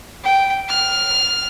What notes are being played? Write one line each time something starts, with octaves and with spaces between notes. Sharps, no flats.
G5
F6